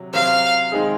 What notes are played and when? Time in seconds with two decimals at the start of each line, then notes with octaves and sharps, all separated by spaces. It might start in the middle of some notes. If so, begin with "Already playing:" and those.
Already playing: C3 F#3
0.13 C3 F#3 C4 F5
0.72 D#3 G#3 C4 D#4 G#4